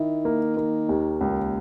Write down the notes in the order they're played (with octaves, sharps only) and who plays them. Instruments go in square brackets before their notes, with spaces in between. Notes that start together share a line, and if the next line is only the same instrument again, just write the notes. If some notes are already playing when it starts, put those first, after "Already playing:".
Already playing: [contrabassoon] D#3 [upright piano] E4
[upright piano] A#3
A#3
D#2
C#2